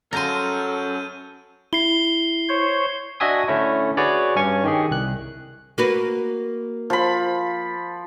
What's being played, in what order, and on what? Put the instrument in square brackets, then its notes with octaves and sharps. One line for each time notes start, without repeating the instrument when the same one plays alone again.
[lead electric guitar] C#4 F#4 [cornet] A4 [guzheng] A#5 C6 [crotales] F6 G6 D#7
[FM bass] E4 [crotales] C7 G7
[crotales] G7
[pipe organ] C5 C#5
[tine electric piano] D4 F#4 D#5 E5 G#5 D#6
D3 A3 C#4 E4
F#4 G#4 B4 C#5 D5
G2 C#4 G#5 C#6
D#3 G4 G#4
C2 F#6
[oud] A#3 F#4 B4
[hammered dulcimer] F3 B5